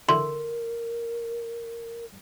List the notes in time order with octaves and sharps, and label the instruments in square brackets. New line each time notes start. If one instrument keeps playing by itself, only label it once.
[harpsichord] D3 E4 [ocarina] A#4 [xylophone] C6